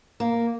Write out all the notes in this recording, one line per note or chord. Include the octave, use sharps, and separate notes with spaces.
A#3